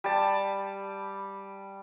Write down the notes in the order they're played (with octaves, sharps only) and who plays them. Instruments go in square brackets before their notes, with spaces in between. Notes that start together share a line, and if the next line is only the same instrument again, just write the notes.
[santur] G3 A5